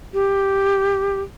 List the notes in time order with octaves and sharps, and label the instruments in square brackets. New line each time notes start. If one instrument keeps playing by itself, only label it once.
[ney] G4